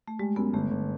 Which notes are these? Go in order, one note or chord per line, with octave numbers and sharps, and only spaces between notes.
A3
G3 G#3
F#2 B3
G1 A3
G1